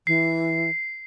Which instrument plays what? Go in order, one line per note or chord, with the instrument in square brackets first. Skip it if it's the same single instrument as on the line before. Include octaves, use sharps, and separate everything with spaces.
[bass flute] E3 [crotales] C7